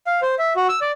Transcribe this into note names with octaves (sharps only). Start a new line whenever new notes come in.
F5
C5
E5
F#4
E6
D5